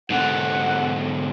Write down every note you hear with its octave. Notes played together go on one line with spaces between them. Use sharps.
G#2 D3 F#5